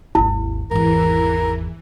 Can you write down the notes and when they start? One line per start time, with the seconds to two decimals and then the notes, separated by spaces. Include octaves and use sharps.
0.15 G#1 D#2 E4
0.71 G#1 E2 E3 A#4